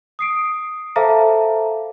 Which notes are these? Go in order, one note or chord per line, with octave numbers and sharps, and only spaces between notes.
D#6 C7 D7
A4 C5 E5 F5 A5 A#5